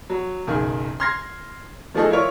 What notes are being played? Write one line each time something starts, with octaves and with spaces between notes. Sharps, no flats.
F#3
F#1 B1 D#3 G#4
C6 F6 G#6 A#6 C7
D#3 F3 A3 G#4 A4 D#5
E4 F4 A#4 C#5